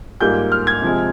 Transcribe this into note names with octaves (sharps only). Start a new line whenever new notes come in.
G#2 G3 A#3 F4 G6
F6
G#6
C3 F3 G#3